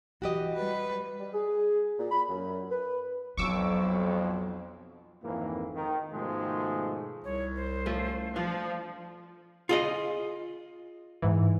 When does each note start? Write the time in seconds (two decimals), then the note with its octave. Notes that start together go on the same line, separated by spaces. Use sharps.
0.22 E3 F#4 G4 D#5
0.55 G3 B4
1.20 G3
1.33 G#4
1.99 A#2
2.11 B5
2.29 F#2
2.71 B4
3.37 B1 F2 F#3 C#6 D6 E6
5.23 G#1 F2 G#2 E3 A#3
5.75 D#3
6.13 G#2 B2 D#3 F3 G#3 A3
7.24 C2 C#5
7.56 C5
7.86 F3 A3 C#4
8.36 F3 D4 F4 F5
9.69 F4 G#4 D#5
11.22 G#2 E3